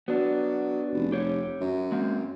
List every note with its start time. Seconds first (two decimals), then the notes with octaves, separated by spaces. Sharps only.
0.08 F#3 B3 D4
0.94 F1
1.12 G4 C#5
1.61 F#2
1.92 G#3 A#3 C4